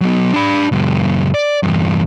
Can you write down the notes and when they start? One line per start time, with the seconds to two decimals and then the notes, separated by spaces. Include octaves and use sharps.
0.01 F#3 B3
0.34 D4 B5
0.72 C#2 F#2
1.34 D5
1.63 E2 G2